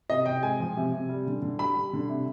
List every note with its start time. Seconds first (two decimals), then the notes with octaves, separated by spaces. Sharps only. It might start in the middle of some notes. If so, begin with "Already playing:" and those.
0.09 C3 D#5
0.26 C3 G5
0.43 G#3 G#5
0.60 F3
0.77 C3
0.93 C3
1.09 G3
1.27 D3
1.42 D3
1.59 G3 B5
1.76 G3
1.93 D3
2.09 C3